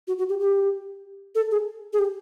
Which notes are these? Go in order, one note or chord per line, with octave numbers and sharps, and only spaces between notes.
F#4
F#4
G4
G4
A4
G#4
G#4
G4